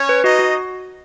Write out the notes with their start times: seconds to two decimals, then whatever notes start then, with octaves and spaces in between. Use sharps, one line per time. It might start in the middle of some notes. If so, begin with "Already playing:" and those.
Already playing: C#4 C#5
0.09 B4
0.24 D#4 F#4 D#5
0.39 F#4